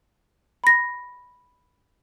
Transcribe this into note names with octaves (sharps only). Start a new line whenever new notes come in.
B5 A#6